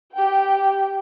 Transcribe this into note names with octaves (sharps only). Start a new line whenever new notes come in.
G4 G5